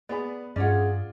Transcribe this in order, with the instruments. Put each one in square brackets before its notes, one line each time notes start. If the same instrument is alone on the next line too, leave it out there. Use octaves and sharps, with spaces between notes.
[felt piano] B3 G#4 B5 [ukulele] D5
[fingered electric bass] G2 D4 [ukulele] C#4 C#5 F#5 [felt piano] F4 D5 [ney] G#4